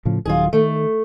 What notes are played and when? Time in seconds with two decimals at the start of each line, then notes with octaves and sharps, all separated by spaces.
0.05 A2 C#3 F3
0.25 D#1 D#3 F#3 F4 G#4
0.53 D#3 A3